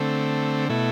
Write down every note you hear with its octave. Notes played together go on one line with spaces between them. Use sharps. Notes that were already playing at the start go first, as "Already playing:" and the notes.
Already playing: D3 A3 C4
B2 A3 E4